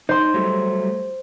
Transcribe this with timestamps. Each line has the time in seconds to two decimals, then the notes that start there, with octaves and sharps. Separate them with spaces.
0.09 D#4 C5 C6
0.34 F#3 G3 A3